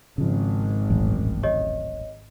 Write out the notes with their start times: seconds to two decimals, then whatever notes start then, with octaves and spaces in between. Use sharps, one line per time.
0.18 G#1 C#3 F3
0.90 D#1 A1 F#2
1.43 G4 C#5 D#5